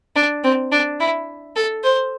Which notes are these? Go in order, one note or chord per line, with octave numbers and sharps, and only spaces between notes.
D4
C4
D4
E4
A4
C5